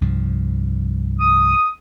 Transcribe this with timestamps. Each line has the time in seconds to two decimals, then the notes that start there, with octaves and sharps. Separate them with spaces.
0.01 C2 G2 F3
1.20 D#6